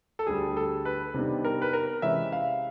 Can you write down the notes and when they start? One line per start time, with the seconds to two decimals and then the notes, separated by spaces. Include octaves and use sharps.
0.19 A4
0.27 D2 D3 G3 G#4
0.57 A4
0.85 B4
1.14 C3 D#3 G3 B3 D4
1.45 A#4
1.62 B4
1.73 A#4
2.02 C3 E3 G#3 C#4 E5
2.32 F5